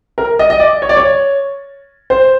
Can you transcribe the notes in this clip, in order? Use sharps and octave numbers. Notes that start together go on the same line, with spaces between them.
A#4
D#5
D#5
D5
C#5
D5
C#5
C5